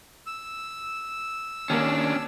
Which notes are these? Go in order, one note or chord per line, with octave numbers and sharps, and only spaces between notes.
E6
D#2 A#3 C#4 D4